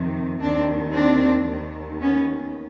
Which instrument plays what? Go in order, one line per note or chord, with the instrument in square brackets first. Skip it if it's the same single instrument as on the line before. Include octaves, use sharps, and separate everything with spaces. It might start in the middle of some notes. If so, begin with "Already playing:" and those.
Already playing: [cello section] F2 C3 D#3
D#2 D#3 C4 D4
C4 D4
D#2 D#3
B3 C#4